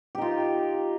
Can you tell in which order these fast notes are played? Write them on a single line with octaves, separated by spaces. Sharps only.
G4 D#4 F4